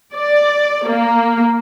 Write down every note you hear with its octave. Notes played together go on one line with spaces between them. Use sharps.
D5
A#3